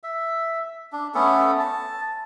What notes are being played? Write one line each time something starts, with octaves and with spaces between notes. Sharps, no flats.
E5
D4
A3 B3 C#4 A4
A5